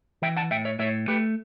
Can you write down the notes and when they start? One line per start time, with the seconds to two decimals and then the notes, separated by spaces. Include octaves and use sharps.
0.22 E3 E5 G5
0.37 F#5 A5
0.51 A2 E5 G5
0.65 C#5 E5
0.79 A2 C#5 E5
1.08 A3 G4 B4